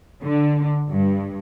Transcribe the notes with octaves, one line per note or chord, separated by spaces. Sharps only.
D3
G2